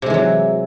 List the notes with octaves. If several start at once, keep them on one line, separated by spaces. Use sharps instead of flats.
C3 E3 F#3 G#3